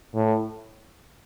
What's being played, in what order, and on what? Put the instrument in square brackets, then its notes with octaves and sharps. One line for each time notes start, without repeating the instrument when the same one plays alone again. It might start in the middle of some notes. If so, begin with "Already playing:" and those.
[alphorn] A2